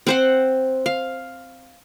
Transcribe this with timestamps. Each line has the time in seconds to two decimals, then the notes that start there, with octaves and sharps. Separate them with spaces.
0.07 C4 C5 F#5
0.86 F5